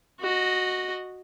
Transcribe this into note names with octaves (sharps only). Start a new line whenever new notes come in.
F#4 D#5